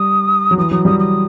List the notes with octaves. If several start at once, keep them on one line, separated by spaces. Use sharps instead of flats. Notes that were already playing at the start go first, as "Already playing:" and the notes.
Already playing: G3 D#6
F#3
E3 D#6
F#3 D#6
G3 D#6
D#6